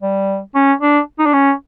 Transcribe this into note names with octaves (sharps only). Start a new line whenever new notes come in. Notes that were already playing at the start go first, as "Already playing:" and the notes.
G3
C#4
D4
D#4
D4
C#4